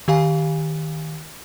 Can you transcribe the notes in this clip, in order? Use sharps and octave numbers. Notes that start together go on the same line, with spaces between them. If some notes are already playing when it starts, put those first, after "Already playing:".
D#3 G4 F5 G#5